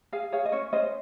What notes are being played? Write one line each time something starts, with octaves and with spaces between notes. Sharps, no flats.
G#4 F5 G#5
G#4 C#5 F5
D#5
C#4 C#5
C#4 C5 D#5